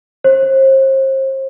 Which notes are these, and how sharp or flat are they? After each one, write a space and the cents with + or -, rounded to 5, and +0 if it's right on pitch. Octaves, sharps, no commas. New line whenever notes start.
C5 +35